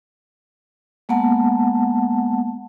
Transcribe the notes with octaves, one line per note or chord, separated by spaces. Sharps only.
G#3 A#3 B3 F#5 A5